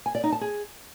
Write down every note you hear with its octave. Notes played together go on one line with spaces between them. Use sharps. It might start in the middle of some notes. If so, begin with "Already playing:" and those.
G#5
D5
D#4
A5
G#4